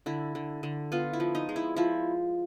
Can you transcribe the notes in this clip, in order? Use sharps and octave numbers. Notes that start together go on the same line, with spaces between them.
D3 E4
D3
D3
B3 F4
E4
F3
D#4
G#3
E4
F3 E4